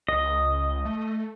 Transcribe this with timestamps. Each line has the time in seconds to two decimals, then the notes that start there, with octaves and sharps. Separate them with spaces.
0.08 C#2 D#5
0.85 A3